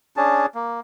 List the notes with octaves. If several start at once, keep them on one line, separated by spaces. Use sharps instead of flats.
C#4 D4 G#4 A5
A#3